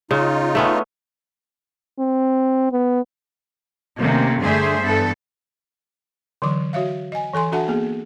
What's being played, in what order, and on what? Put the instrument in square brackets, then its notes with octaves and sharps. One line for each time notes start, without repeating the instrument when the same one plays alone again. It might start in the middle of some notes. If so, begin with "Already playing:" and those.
[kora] C#3 [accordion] D#4 F4
[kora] A3 B3 C#4
[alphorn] C4
B3
[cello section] C3 D#3 A3 A#3 C#4
G2 D3 A3 G#4 C5 E5
G2 E3 B3 A4
[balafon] D3 E3 F#3 D6
F#4 C#5 E5 F5
D#5 G#5
E3 A4 G#5 C6
D4 F#4 A4 E5 F#5 A5
A#3 B3 G#4